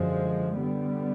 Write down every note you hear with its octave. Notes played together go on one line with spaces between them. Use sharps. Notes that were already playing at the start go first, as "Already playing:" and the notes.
Already playing: F#2 D3 F3 G#3
D3 G3 B3